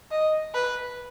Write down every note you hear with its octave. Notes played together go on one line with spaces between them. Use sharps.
D#5
B4